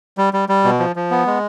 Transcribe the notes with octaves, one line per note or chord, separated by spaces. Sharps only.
G3
G3
G3
B2
F3
F3
B3
G#3